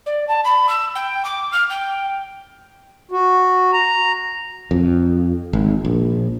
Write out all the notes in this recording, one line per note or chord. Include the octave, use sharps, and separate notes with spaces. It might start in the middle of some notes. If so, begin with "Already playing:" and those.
D5
A5
B5
E6
G5
D6
F6
G5
F#4
A#5
F2
G#1
A#1